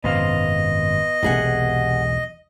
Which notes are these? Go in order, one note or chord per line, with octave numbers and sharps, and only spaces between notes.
G#1 F#2 C3 B3 C5 D#5 F5
E1 B1 C3 G#4 F#5